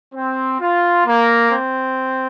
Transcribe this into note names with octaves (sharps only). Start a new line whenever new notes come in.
C4
F4
A#3
C4